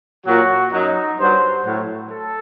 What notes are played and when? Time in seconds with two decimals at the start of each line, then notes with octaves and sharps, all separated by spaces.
0.26 A#2 F#3 F#4
0.71 F#2 F#3 D#4
1.18 G2 F#3 C5
1.64 A2 F#3
2.11 A4